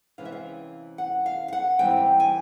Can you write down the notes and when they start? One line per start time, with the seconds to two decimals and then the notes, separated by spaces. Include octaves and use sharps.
0.18 C3 E3 G#3 C#4 F5
0.25 E5
0.32 F5
0.98 F#5
1.26 F5
1.48 F5
1.53 F#5
1.79 G#2 E3 G3 C4 G5
2.20 G#5